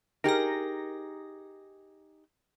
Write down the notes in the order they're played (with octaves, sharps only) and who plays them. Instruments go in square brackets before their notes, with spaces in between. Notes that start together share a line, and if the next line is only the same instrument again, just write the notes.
[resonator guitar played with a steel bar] D#4 G4 G#4 [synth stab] A#4 A#6